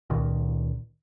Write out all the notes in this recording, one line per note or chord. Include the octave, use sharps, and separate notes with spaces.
C#2 A#2 D#3